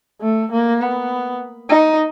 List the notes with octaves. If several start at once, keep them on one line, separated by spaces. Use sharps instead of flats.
A3
A#3
B3
D#4